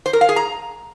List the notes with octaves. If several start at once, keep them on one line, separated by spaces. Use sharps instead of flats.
C5
A#4
F5
G#4
A#5